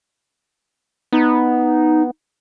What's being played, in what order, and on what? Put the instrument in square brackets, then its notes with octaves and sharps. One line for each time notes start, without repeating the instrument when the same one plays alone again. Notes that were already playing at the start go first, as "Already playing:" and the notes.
[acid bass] B3 [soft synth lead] D#4